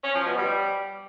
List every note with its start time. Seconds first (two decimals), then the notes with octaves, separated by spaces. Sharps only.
0.03 C#4
0.14 F3
0.25 B2
0.36 G3